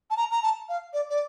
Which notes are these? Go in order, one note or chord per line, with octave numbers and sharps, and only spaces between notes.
A5
A#5
A#5
A5
F5
D5
D5